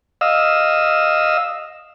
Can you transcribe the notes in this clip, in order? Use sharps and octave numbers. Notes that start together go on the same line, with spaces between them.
D#5 F5 E6